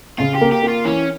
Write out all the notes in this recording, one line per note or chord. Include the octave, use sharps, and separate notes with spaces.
C#3 F4
G4
A#3
G4
A#3
F4
E3 C#4